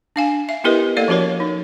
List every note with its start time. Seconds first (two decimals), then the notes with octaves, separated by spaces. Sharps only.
0.16 D4 F5 G#5
0.49 E5
0.64 B3 E4 G4 A#4 B4 D#5
0.97 A#3 A4 D5 F5
1.08 F3 C#4 F#4 A#4 C#5
1.40 D#4